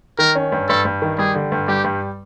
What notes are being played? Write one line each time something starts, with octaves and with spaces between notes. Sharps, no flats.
D#3 A#4
C#4
G2
G2 A4
G2
D#3
G3 G#4
D3
G2
G3 G4
G2